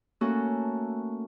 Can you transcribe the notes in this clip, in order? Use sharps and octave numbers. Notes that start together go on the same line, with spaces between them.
A3 A#3 C#4 F#4 A4